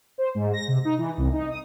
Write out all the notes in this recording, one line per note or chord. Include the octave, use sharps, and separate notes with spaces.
C5
G#2
A#6
C3
D#4
E3
C2
D#4
D#6